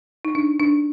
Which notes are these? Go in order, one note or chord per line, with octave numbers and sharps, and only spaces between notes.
D#4
D4
D4